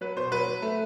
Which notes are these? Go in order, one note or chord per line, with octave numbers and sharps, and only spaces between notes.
F#3 B4
B2 C5
F#3 B4
F#3
A3